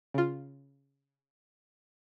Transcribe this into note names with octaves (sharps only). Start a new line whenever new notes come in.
C#3 F4